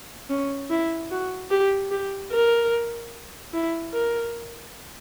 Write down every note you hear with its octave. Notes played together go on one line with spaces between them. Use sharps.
C#4
E4
F#4
G4
G4
A#4
E4
A#4